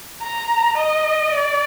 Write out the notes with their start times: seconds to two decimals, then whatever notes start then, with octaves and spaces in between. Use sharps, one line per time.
0.22 A#5
0.77 D#5
1.32 D5